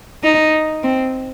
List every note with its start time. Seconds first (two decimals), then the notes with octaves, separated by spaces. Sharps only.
0.23 D#4
0.83 C4